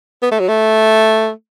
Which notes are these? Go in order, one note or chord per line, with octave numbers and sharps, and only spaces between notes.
B3
A3
F#3
A3